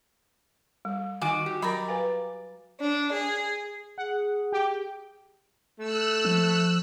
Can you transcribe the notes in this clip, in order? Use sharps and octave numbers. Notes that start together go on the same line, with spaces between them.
G3
D#3 F#4 G#5 D6
F#4 G4
F#3 A#4 D5 B5
B4 F5 G#5
D4
G#4
G#4 F#5
G4 G5
A3 E6 F#6
F3